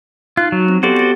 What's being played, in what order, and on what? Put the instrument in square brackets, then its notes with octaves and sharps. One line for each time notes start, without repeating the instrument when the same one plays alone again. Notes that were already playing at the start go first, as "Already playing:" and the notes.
[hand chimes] D#4 F#6 [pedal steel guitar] F4
[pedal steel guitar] F#3
[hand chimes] C4
[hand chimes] B3 G4 A4 [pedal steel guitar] F#4 C5 D5
[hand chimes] G4 A6